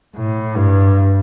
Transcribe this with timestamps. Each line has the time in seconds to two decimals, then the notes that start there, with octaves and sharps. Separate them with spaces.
0.16 A2
0.56 G2